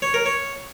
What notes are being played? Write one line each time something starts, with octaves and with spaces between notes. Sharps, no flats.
C#5
A#4
C#5